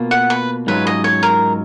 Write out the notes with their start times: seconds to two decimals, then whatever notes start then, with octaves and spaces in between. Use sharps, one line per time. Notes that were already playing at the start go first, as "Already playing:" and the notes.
Already playing: B2 A#3 F4
0.11 F#5
0.30 B4
0.67 G#2 F#3 C#4 F4 B4
0.87 D#5
1.04 C#5
1.23 A#4